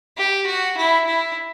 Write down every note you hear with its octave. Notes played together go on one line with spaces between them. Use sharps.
G4
F#4
E4
E4